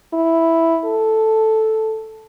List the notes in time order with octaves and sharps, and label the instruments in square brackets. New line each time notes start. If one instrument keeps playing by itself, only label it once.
[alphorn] E4
A4